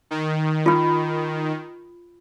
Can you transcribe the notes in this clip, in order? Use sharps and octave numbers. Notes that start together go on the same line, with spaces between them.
D#3
F4 B5